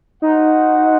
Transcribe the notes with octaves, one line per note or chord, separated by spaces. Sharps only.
D#4 F#4 C5 F#5